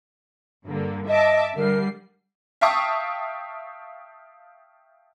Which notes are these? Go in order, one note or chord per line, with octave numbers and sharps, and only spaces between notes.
G2 D3 A#3
D#5 E5 A5 D6
D3 G3 A#4 C7
E5 F5 G5 A5 C#6 D#6